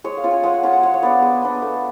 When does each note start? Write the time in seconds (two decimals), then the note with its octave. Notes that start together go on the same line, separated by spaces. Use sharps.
0.04 G#3 C#5
0.17 F5
0.24 C#4 F4
0.31 G#5
0.43 G#3 F#5
0.54 F#5
0.63 C#4 F4 G#5
0.73 F#5
0.83 G#3 F5
0.94 C#5
1.03 B3 D4 D5
1.22 G#3
1.42 B3 D4
1.62 A3